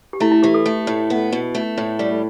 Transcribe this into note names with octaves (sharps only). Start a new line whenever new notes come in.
G4
A3 E4
E4
E3 G4
A4
A3
A2
B3
B2
A3
A2
G3